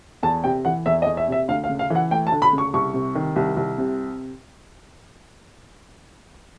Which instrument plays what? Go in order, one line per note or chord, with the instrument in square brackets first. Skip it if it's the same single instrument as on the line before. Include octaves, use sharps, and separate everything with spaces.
[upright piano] E2 A5
C3 G5
E3 F#5
E2 E5
D#5
E2
E5
C3 E5
D2 F5
F5
C#3
F5
E3 F#5
A3 G5
A5
D2
B5
C#3
C#6
C2 C#6
C3
D#3
C2
C2
C3